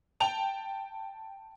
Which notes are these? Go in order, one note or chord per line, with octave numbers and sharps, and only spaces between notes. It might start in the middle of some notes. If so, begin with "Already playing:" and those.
G5 A5 F7